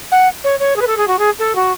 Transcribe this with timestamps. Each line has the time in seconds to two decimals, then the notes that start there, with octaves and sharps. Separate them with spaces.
0.11 F#5
0.44 C#5
0.59 C#5
0.76 G#4
0.81 B4
0.87 A4
0.97 G#4
1.07 F#4
1.19 G#4
1.39 A4
1.55 F#4